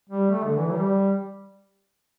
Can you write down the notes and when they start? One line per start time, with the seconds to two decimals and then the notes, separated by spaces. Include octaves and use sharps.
0.10 G3
0.30 A3
0.44 D3
0.58 E3
0.72 G3